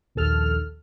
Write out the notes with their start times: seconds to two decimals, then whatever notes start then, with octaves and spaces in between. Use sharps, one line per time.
0.15 A#1 D#2 A4 F6